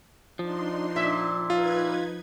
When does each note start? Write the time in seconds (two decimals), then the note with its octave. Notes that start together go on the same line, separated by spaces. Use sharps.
0.39 F3 D4 D#4 C6
0.96 A#2 E5
1.50 D#4 F4 B4 G#6